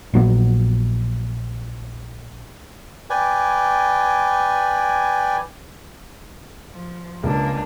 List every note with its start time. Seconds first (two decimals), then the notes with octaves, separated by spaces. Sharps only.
0.14 A#1 F#3 B3
3.10 B4 D5 G5 G#5
6.72 F3
7.23 C#2 G#3 A#3 D4